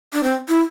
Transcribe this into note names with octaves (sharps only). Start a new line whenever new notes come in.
D4
C4
E4